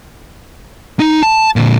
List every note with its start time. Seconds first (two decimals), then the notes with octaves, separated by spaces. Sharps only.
1.00 D#4
1.23 A5
1.56 A#2 D3